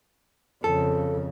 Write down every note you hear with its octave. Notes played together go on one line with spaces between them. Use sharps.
F2 C#3 A4